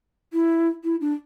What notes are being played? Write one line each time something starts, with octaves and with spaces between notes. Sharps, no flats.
E4
E4
D4